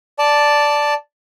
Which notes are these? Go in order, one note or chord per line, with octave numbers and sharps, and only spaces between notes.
D5 A5